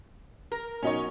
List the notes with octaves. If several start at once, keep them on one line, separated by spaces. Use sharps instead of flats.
A#4
B1 C#4 D#4 F#4 C#5